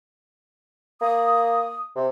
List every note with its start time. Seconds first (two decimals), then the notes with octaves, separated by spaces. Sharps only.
1.01 A#3 D#6
1.96 C3